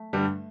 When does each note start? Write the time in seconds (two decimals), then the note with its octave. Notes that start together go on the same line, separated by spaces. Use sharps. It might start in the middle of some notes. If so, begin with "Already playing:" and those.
Already playing: A3
0.13 G2 D3 G3